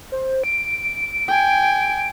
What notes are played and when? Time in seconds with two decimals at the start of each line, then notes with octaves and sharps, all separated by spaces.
0.12 C5
0.44 D7
1.28 G5 G#5